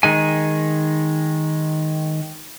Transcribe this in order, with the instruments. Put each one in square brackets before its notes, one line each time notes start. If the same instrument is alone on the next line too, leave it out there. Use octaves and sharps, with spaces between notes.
[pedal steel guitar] D#3 G#3 G#5